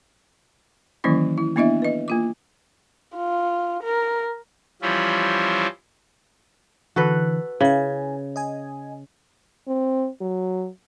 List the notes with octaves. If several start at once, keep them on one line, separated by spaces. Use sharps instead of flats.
D#3 E3 F#3 A#3 C#4 E4
E4
A#3 B3 D4 E4 D#5 E5
B4 D#5
A#3 F4 D6
F4
A#4
E3 F3 G3 C#4 E4 F4
D3 E3 F#4 A4 B4
C#3 E4 G#5
D#5 G#5
C4
F#3